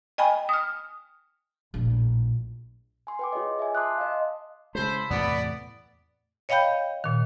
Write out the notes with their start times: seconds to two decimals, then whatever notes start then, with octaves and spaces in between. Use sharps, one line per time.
0.18 D#5 G5 G#5 B5
0.49 D#6 F6
1.74 A#1 A2
3.07 G#5 C6
3.19 B4 G5 D6
3.33 F4 G#4 C#5 D#5
3.59 E5 G#5
3.75 A5 C6 D6 D#6 F#6
3.98 D#5 F5
4.75 C#3 G#3 E4 C5 A5 B5
5.10 E2 A2 C3 B3 D5
6.49 C#5 D#5 F5 G5 B5 G6
7.04 A#2 D#3